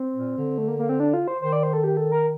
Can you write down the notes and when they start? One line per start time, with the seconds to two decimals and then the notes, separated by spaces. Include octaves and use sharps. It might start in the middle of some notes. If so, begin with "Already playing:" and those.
Already playing: C4
0.16 A#2
0.38 D3
0.58 A3
0.68 A#3
0.79 A#3
0.89 C4
1.00 D4
1.13 F4
1.28 C5
1.42 D#3 C5
1.53 D5
1.63 C5
1.73 A4
1.84 G4
1.97 A4
2.12 A#4